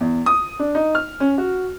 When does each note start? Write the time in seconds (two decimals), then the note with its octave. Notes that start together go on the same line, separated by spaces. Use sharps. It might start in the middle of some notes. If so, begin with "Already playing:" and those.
0.01 E2
0.26 D#6
0.59 D4
0.75 D#4
0.95 F6
1.20 C#4
1.38 F#4